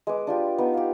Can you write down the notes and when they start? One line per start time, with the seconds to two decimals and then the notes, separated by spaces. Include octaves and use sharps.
0.07 G#3 B4 D6
0.27 D4 F4 G4
0.58 B3 D#4
0.74 G4 F5